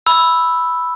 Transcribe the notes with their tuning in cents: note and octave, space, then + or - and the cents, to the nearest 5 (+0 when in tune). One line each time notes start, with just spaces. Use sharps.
B5 +0 E6 +0